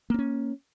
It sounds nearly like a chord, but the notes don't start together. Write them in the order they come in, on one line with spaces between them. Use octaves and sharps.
A#3 C4 C#4